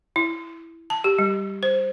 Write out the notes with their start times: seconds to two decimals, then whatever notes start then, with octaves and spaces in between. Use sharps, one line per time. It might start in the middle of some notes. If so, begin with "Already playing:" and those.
0.16 E4
0.90 A5
1.04 G4
1.19 G3
1.63 C5